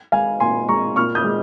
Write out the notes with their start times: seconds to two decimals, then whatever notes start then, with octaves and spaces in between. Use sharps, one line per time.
0.12 G#3 F5 G#5
0.40 A#2 G#5 C6
0.69 G#3 A#5 C#6
0.96 A#2 C#6 F6
1.15 D#6 G6
1.24 G#3